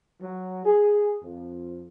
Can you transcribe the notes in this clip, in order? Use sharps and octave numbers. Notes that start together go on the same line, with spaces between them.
F#3
G#4
F2